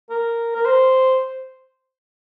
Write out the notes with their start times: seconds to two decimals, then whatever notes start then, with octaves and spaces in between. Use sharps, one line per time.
0.10 A#4
0.55 A#4
0.65 C5